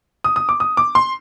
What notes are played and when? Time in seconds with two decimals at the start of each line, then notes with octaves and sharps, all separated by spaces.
0.24 D#6
0.36 D#6
0.49 D6
0.60 D#6
0.77 D6
0.95 C6